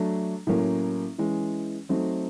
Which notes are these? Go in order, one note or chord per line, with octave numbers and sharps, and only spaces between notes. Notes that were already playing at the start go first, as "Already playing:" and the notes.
Already playing: F#3 A3 D4
A2 F#3 A#3 C#4
E3 G#3 C#4
F#3 A3 C4 D#4